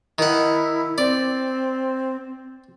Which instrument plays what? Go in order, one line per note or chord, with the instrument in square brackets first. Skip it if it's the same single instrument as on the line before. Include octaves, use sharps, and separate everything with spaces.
[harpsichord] D#3 F#5 [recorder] E4
[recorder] C4 [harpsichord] D5